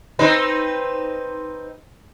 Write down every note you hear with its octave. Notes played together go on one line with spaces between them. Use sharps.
C4 D#4 B4